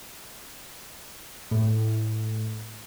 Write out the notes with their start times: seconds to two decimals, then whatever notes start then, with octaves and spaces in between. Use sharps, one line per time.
1.51 A2